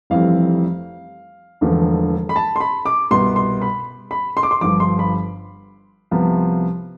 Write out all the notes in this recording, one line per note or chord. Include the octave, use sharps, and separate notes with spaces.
F1 F2 E3 G3 C4 F5
E1 E2 D3 F3 A3
B5
A5
C6
B5
D6
C2 B2 B3 C6
C6
B5
B5
C6
D6
C6
G1 G2 F3 D6
C6
B5
C2 C3 F3 B3